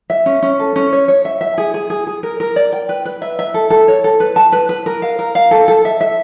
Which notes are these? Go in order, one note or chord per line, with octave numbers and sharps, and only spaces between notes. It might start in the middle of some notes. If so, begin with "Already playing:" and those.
E5
C#4
C#4
A4
C#4
C#5
C#5
E5
E5
G#4
G#4
G#4
G#4
A#4
A#4
D5
G5
B4
B4
E5
E5
A4
A4
C#5
A4
B4
A5
B4
B4
A#4
F5
A#4
F5
A4
A4
E5
E5